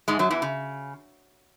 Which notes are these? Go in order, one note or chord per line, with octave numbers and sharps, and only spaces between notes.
G#2 G#3
F#2 F#3
E2 E3
C#3